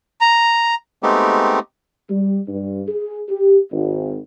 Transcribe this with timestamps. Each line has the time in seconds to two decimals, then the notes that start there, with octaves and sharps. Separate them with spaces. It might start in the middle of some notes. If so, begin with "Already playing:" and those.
0.21 A#5
1.03 G#3 A3 B3 C4 D#4 G4
2.10 G3
2.48 G2
2.88 G#4
3.29 G4
3.71 G#1